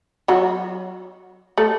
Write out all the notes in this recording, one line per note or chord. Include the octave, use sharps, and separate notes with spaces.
F#3 F#4
A3 A4